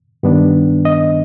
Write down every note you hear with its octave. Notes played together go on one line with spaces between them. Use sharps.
G2 D#3 B3 D4
D#5